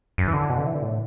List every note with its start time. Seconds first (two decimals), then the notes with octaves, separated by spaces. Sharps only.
0.18 F#2
0.28 E3
0.33 D3
0.50 B2
0.58 D3
0.67 E3
0.74 D3
0.82 A2